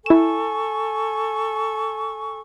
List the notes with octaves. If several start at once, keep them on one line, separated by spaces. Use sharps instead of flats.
E4 A4 G#5 C#6 E7